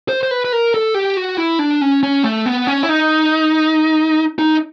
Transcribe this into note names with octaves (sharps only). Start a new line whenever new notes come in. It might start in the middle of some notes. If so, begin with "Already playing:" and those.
C5
C5
B4
B4
A#4
A4
G4
F#4
E4
D4
C#4
C#4
A3
B3
C#4
E4
D#4
D#4